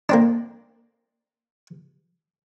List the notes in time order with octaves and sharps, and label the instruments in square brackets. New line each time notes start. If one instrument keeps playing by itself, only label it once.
[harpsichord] A#3 C4 D4